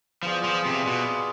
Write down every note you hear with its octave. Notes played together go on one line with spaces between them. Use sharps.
F3 B3 F4 G#4 D5 F5
F3
C3
B2